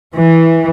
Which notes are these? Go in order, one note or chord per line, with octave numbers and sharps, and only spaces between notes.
E3